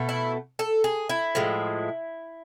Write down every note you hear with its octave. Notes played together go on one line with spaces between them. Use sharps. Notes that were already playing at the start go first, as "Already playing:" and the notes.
Already playing: B2 A3
E4
A4
G#4
E4
A2 F3 G#3